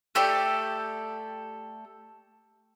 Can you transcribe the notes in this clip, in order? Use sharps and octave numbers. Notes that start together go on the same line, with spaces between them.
A3 G4 A4 D5